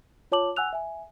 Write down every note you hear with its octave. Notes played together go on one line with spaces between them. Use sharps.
F4 C#5 A5 D6 F#7
F#5 G#5 E6 F#6 F7
E5 G#5